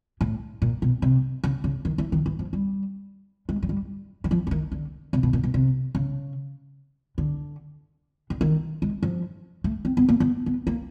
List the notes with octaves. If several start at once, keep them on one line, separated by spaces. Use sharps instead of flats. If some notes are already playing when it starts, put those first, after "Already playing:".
A2
A#2
B2
C3
C#3
C#3
D#3
E3
D#3
E3
F3
G3
G#3
F#3
G3
E3
F3
D3
D#3
D3
C3
B2
A#2
B2
C3
C#3
D3
D3
D#3
G#3
F3
A3
C4
B3
A#3
B3
B3
A#3